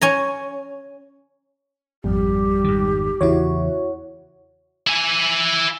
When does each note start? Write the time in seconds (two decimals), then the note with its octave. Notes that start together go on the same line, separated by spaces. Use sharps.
0.01 C#4 G#5 A#5
2.04 G#1 F2 G3 G4
2.64 G#2 D#3
3.21 E2 C#3 E4 F#4 C#5
4.87 E4 G#5